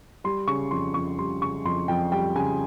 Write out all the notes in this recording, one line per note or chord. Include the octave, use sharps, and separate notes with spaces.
G3 C6
C#3 C#6
F2 C6
F2 C#6
G3 C6
C#3 C#6
F2 C6
F2 G5
G3 G5
C#3 G#5